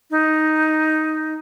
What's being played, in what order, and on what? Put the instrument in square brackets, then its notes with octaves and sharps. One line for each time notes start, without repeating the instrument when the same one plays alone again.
[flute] D#4